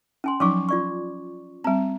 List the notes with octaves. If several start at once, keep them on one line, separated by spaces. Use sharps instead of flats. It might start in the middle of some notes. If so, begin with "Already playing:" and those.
C#4 G#5 C6
F3 F#3 C#4 D#4 C#6 D6
F4 D5 C#6
G3 C4 A#5